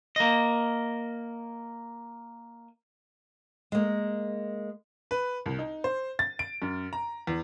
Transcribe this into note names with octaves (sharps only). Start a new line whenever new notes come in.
A#3 D#5
G#3 A#3
B4
C2
D#4
C5
A6
D7
F#2
A#5
E2